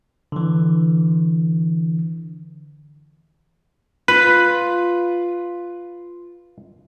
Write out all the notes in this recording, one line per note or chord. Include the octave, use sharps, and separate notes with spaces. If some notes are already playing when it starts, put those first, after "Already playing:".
D3 E3
F4 B4